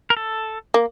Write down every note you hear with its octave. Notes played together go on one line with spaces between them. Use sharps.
A#4
A4
A#3